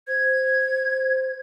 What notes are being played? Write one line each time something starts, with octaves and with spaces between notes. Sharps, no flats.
C5 G#6